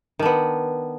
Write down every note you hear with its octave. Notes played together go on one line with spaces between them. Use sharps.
D#3 B3 D4